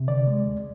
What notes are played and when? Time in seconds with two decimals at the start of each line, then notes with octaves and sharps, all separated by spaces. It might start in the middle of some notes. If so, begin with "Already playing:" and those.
Already playing: C3
0.08 D3 D5
0.27 G#3
0.46 D2